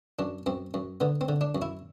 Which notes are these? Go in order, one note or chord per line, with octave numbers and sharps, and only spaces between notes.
F#2 D4
F#2 C4
F#2
D3 B3
C4
D3
D4
F#2
E4